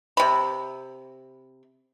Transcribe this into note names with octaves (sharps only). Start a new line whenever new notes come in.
C3 B5